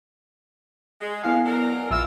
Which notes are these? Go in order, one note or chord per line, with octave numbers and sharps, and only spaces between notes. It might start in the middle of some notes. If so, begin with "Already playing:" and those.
G#3
F2 B3 E4 F5 G#5
F#3 D4 A#4
A#1 E3 F4 E5 E6 F6